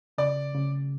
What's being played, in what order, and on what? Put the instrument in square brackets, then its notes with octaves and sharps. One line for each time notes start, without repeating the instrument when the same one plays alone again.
[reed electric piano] C#3 [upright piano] D5
[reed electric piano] C#3